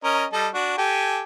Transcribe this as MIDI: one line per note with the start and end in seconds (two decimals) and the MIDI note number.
0.04 0.25 61
0.04 0.25 70
0.04 0.25 75
0.33 0.48 55
0.33 0.48 69
0.33 0.48 75
0.54 0.75 62
0.54 0.75 66
0.78 1.21 67
0.78 1.21 69
0.78 1.21 80